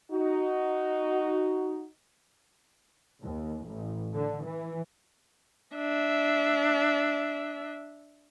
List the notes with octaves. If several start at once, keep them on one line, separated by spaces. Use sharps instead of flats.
D#4 F#4
D#2
A1
D3
E3
D4 E5